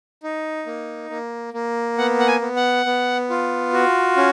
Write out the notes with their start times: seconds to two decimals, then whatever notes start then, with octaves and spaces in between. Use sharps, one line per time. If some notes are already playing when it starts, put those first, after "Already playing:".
0.23 D#4
0.66 A#3
1.10 A#3
1.54 A#3
1.98 B3 F#5
2.19 F#5
2.27 G#5
2.41 B3
2.56 F#5
2.86 B3
3.30 F4
3.73 F#4
4.17 C#4